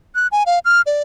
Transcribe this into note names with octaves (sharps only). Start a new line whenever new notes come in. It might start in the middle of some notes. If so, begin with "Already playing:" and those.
F#6
G#5
F5
F6
D5